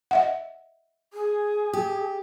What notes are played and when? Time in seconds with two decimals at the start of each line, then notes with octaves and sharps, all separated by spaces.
0.11 D#5 E5 F#5
1.13 G#4
1.73 G4